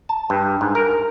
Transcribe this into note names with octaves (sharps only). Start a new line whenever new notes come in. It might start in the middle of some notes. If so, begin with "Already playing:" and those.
A5
G2
G#2
A#4